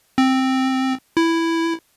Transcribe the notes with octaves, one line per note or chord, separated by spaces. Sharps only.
C4
E4